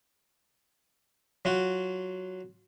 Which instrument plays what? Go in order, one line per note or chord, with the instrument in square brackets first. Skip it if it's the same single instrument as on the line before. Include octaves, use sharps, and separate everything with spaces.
[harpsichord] F#3 F4 F#4